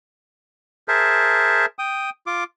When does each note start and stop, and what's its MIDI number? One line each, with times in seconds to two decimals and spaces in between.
0.88 1.66 68
0.88 1.66 70
0.88 1.66 72
0.88 1.66 76
0.88 1.66 81
1.79 2.10 79
1.79 2.10 87
2.27 2.44 65
2.27 2.44 86